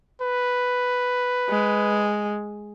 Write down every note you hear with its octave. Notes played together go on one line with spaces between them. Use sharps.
B4
G#3